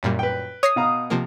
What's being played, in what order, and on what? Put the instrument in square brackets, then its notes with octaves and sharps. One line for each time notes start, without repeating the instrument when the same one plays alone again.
[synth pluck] F#2 A#2 G3
[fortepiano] B4 G5
[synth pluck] C#5 A#6 C7 [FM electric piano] D#6
[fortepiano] B2 F5 A#5
[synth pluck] C3 F3 A#3